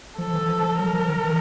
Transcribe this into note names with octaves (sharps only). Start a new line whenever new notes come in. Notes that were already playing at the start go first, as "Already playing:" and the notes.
F3 A4
E3
F3
F3
F#3 A#4
F3
D#3
E3